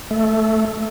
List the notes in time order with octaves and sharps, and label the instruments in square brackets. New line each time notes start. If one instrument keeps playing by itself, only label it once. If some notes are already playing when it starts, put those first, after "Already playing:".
[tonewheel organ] A3